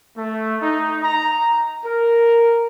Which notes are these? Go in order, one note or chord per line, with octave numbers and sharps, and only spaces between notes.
A3
D#4
A#5
A#4